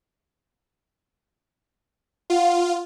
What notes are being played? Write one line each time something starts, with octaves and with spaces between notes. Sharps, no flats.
F4 F5 F#5